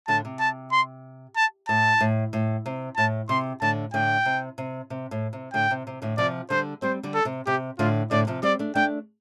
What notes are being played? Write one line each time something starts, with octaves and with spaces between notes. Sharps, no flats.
A2 D3 A5
C3
A5
C6
A5
A2 A5
A2
A2
C3
A2 A5
C3 C6
A2 D3 A5
A2 D3 G5
C3
C3
C3
A2
C3
A2 D3 G5
C3
C3
A2 D3
C3 F3 D5
D3 G3 C5
G3 C4 C5
D3 G3
A4
C3
C3 G4
A2 D3 F4
A2 D3 D5
C3 F3
G3 C4 D5
A3 D4
A3 D4 G5